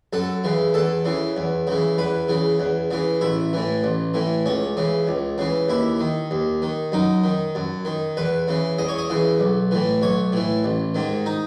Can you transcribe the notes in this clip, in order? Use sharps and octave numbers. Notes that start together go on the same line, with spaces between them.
F#2 A4
C#3 E3
E2 A4
C#3 E3
E2
C#3 E3
E2 B4
C#3 E3
E2
C#3 E3
A1 E4
A2 E3
A1
A2 E3
C#2 C#4
C#3 E3
C#2
C#3 E3
D#2 E4
D#3
D#2
D#3
F#2 D#4
D#3
F#2
D#3
E2 B4
C#3 E3
E2 D#5
C#5
D#5
C#3 E3
B1
A2 E3
B1 C#5
A2 E3
A1
G#2 D#3
D#4